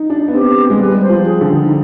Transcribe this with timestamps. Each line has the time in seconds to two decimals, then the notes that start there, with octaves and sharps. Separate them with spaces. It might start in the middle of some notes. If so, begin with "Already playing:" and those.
Already playing: D#4
0.10 D4
0.28 B3
0.33 C4 G4
0.70 G#3
0.79 G3 B4
1.02 C5
1.09 F3
1.26 G#4
1.41 D3
1.64 D#4